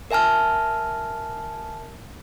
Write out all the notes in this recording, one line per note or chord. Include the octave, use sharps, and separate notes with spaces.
A#4 E5 G#5 A5 F6